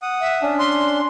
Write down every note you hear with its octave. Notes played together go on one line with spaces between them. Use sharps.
F#5 D#6
E5
C#4 D4
C6